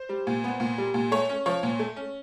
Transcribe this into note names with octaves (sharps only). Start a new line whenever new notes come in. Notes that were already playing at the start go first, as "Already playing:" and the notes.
Already playing: C5
G3
A#2
B3
A#2
G3
A#2
A3 C#5
C#4
F3 C#5
A#2
A3
C#4